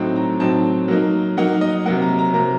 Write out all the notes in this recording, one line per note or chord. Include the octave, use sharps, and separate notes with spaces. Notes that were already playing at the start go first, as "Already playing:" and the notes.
Already playing: A2 F#3 C4 D#4
A#5
A2 F#3 C4 D#4 A5
F#3 A#3 D#4
F#3 A#3 D#4 F#5
D#5
C3 F#3 A#3 F#5
A#5
A#5
C3 F#3 A#3 A#5